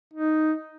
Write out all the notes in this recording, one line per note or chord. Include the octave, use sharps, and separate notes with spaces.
D#4